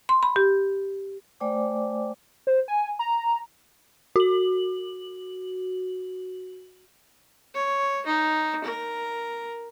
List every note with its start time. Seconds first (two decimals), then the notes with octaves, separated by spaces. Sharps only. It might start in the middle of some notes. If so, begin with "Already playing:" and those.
0.09 C6
0.23 B5
0.36 G4
1.40 A3 C5 D5 G5 G#5 D6
2.47 C5
2.68 G#5
2.99 A#5
4.16 F#4 F#7
7.54 C#5
8.06 D#4
8.64 A#4